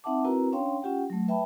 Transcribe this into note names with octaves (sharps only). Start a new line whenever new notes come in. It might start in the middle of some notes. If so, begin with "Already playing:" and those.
C4 D#4 E5 F#5 A5 D6
C4 E4 F#4 A#4 B4 A#5
C#4 D4 C#5 F5 G5 C6
C#4 F4 G4 F#5 G5
F#3 A3
B4 E5 G5 A5 B5